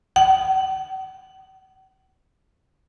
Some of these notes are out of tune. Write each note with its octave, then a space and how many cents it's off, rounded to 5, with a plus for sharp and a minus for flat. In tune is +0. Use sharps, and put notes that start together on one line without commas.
F#5 +45